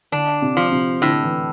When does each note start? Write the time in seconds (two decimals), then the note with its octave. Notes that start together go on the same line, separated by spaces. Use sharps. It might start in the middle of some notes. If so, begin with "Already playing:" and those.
0.12 D3 D4
0.42 C3
0.57 F3
0.72 C3
1.02 A2 D3
1.24 E3